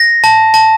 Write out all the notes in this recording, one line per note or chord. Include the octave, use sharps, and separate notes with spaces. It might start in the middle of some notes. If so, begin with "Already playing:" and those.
Already playing: A#6
A5
A5